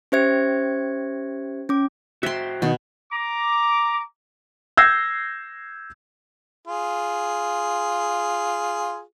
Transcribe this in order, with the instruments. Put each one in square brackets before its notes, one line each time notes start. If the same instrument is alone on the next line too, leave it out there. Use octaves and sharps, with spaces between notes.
[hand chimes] C#4 G4 C5 E5 G#6 C#7
C#4 D6
[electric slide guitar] F#4 C5 G5 [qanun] E5 C6
[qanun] B2 [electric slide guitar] D#3 D4 D#4
[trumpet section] A#5 D6
[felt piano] E6 G6 G#6 A#6 C7
[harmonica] F4 G#4